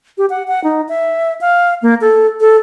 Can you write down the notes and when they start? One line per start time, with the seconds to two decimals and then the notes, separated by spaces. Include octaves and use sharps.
0.18 G4
0.30 F#5
0.48 F#5
0.64 D#4
0.89 E5
1.41 F5
1.82 A#3
2.01 A4
2.40 A4